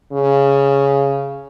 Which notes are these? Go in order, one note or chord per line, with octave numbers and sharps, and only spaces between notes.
C#3